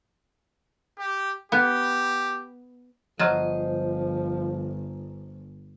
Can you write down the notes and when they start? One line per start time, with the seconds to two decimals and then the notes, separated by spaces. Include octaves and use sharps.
0.98 G4
1.52 B3 G4
3.19 G1 F3 F#3 F4 C5 D#5